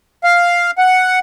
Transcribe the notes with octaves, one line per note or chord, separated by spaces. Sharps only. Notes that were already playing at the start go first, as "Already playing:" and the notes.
F5
F#5